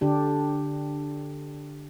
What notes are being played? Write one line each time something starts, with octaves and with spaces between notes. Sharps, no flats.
D3 D4 G4